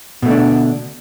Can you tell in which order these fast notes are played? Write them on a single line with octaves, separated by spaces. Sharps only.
B2 A3 D3 D4